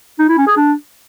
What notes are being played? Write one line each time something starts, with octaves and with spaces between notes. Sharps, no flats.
D#4
E4
C#4
G#4
D4